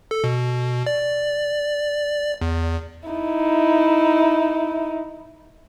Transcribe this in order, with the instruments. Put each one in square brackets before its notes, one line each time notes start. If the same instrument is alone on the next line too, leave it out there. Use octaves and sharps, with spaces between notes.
[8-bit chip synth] A4
B2
D5
E2
[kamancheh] D#4 E4